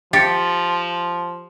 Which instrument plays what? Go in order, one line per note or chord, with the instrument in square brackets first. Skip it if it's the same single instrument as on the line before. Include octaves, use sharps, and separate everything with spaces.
[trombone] F3 [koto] G4 [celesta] A6 C#7